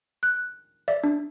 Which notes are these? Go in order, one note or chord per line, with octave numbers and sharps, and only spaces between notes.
F#6
D5 E5
D4